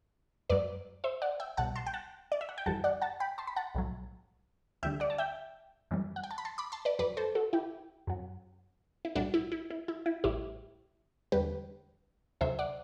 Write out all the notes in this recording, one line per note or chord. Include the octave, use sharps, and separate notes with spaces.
F#2 F#3 B4 D5
C5 E5
D5 F#5
E5 G5
B1 B2 G3 F#5 A5
A5 C6
G5
F#5 A5
D5
E5
F#5
G5
G1 F#2 E3 G3 F#5 A5
D5 F#5
F#5 A5
G5 B5
A5 C6
B5
F#5 A5
B1 A2 F#3
D2 D3 G3 E5 G5
D5 F#5
A5
E5 G5
F#2 E3 G3
F#5
G5
A5
B5
A5 C6
B5 D6
A5 C6
B4 D5
F#2 F#3 B4 D5
A4 C5
F#4 A4
E4 G4
F#2 F#3
E4
B1 A2 G3 D4 F#4
E4
E4
E4
E4
E4
A1 A2 G3 E4 G4
E2 D3 G3 G4 B4
D2 C3 F#3 C5 E5
D5 F#5